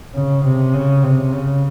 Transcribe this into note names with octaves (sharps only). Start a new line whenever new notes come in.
C#3
C3
C#3
C3
C#3